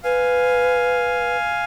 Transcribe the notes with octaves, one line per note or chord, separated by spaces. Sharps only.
B4 F5 G#5